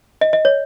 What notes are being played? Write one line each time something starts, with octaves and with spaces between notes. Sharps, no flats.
D#5
D#5
C#5